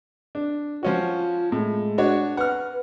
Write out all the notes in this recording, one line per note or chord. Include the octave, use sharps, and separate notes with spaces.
D4
F3 C#4 F4 F#4
A2 G#3
D4 F#4 C#5
B4 F#5 F6